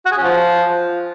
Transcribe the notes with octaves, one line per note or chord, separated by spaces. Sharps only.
F#4
G#4
C#4
F3